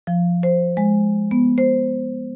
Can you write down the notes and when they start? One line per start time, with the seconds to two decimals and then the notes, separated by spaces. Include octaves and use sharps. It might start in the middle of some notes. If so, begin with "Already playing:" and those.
0.07 F3
0.43 C5
0.77 G#3
1.31 B3
1.58 C5